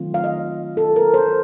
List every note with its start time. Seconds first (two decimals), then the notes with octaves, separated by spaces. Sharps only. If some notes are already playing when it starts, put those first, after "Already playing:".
Already playing: D#3 F#3 A3 C4 F4
0.14 F5
0.24 D#5
0.77 A4
0.96 A#4
1.14 C5